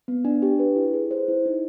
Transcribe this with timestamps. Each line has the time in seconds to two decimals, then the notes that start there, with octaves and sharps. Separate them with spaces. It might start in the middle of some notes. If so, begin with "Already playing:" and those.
0.08 B3
0.25 D4
0.42 G4
0.59 B4
0.76 E4
0.93 G#4
1.11 C5
1.28 E4
1.46 D#4